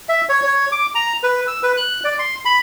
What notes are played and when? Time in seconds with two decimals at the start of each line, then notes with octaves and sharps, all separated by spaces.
0.09 E5
0.29 C#5
0.43 C#5
0.72 D6
0.95 A#5
1.23 B4
1.47 E6
1.63 B4
1.77 F#6
2.04 D5
2.19 C6
2.45 B5